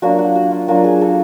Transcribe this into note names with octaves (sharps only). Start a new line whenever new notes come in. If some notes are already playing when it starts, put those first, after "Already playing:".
F#3 A#3 D4 F4 F#4
F#4
F#4
F4
F#3 A#3 D4 F4 F#4
G#4
A4